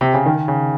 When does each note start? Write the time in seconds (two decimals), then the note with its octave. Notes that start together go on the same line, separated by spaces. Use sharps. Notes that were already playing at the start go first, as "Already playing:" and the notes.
0.01 C3
0.14 C#3
0.26 D#3
0.48 C#3